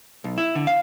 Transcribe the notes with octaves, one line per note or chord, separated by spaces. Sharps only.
B1
E4
D3
F5